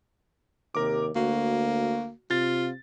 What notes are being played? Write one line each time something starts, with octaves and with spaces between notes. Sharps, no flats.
D#2 C3 A#4 D6
D2 A#3 F#4
C3 F4 A6